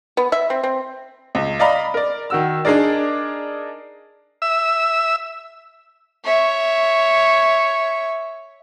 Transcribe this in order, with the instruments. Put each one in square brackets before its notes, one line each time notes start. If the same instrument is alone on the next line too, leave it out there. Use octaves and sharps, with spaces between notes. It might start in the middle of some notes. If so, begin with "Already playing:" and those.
[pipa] B3
E5
C4
C4
[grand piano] C#2
D5 D#5 F5 A#5 B5
A#4 D5
D#3 F#4 E6
D4 D#4 G#4 A#4 D5
[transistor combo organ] E5 E6
[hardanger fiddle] C#5 E5